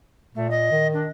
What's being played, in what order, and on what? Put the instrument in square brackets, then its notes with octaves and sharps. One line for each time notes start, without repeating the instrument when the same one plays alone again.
[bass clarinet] A#2 [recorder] A3
[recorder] D#5
[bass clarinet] D#3
[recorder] D4